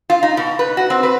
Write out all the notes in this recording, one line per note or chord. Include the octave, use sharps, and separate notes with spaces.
F4
D#4
B2
B4
F#4
C4
B4